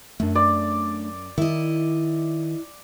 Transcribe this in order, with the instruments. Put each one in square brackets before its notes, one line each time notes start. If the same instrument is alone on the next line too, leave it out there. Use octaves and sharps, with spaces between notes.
[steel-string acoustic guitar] F#2 [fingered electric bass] A3 D4
[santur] D5
[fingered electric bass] D#3 [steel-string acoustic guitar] E4 D#5